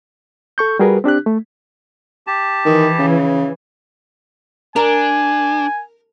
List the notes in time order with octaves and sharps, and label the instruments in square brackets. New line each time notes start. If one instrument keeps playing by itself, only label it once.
[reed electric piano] A4 C#6 G6
G3 F#4 G#4 A#4 B4
C4 D4 G4 F#6
A3
[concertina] G4 A5
[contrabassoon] D#3 [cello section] E3
[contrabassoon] C#3
[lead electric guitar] D4 [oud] A#4 [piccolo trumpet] G#5